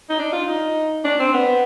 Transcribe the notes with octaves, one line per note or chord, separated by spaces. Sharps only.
D#4
D4
F4
D#4
D4
C4
B3